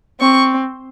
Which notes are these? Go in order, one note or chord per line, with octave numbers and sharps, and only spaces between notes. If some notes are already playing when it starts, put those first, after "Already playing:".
C4 C#6